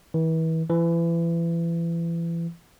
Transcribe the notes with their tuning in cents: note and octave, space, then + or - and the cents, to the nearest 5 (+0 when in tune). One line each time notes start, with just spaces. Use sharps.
E3 -35
E3 +30